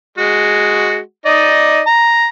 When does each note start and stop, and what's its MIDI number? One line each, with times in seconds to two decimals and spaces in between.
0.18 0.98 56
0.18 0.98 66
1.26 1.80 63
1.26 1.80 74
1.26 1.80 75
1.87 2.26 82